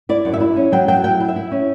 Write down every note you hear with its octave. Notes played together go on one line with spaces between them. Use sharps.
E4 D5
F#2
E5
E4
C#4
F#3 G5
F#3 G5
E4 G5
E4
E5
E4
C#4